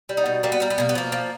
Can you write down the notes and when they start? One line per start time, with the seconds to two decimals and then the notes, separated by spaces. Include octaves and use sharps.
0.09 G3
0.17 D#4
0.26 B2
0.43 G3 A#3
0.52 B3
0.60 G3 A#3
0.70 B3
0.78 B2 A#3
0.89 B3
0.95 F3 A#3
1.12 F3